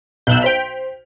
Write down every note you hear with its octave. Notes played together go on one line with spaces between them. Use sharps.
B1 E6 F#6 G6
C5 G5 B6 F7